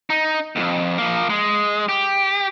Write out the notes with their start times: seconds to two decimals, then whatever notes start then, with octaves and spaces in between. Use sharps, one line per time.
0.10 D#4
0.56 B1 F2
0.98 F3 A#3
1.30 G#3
1.89 G4